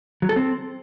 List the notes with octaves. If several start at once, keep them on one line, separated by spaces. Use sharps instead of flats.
F#3
A4
C4